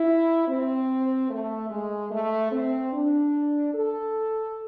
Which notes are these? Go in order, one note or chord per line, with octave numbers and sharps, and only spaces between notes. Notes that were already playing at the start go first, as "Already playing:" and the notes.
Already playing: E4
C4
A3
G#3
A3
C4
D4
A4